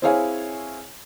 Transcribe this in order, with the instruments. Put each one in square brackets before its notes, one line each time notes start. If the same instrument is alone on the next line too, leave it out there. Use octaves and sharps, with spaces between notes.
[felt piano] C4 E4 G#4 C#5 F5 G#5